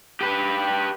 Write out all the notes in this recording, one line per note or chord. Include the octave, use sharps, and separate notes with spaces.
G4 B4